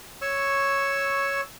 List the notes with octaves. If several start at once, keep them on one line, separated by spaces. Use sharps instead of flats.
C#5 C#6 E6